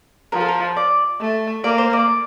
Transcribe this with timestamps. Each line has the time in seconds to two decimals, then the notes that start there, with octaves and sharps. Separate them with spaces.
0.32 F3 A#4
0.41 A4
0.48 A#4
0.77 D5
1.20 A3
1.63 A#3 D5
1.78 C5
1.93 D5